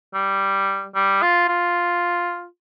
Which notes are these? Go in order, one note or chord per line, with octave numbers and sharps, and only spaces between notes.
G3
G3
F4
F4